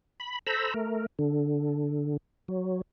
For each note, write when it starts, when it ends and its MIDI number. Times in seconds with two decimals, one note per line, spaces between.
0.20 0.39 83
0.47 0.74 69
0.47 0.74 72
0.47 0.74 82
0.47 0.74 83
0.47 0.74 88
0.74 1.06 57
0.74 1.06 70
1.19 2.17 50
2.48 2.81 54